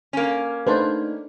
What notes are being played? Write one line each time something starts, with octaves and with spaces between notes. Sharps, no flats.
A#3 C#4
A3 D4 D#4 B4 C5 A5